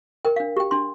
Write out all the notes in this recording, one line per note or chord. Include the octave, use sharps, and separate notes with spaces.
A#4 G5
D4 F5
G4 G5
D4 C6